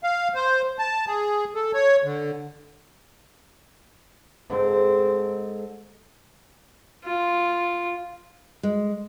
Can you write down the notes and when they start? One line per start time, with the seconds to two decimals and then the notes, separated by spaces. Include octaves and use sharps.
0.04 F5
0.35 C5
0.79 A5
1.07 G#4
1.55 A4
1.74 C#5
2.04 D3
4.50 G#2 C4 A4
7.04 F4
8.63 G#3